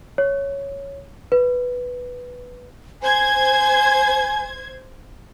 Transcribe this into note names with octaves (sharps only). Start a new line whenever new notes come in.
C#5
B4
C5 G#5 G#6